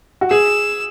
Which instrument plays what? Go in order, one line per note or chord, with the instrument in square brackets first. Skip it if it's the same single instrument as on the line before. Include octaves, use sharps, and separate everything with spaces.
[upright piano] F#4
[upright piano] G#4 [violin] E6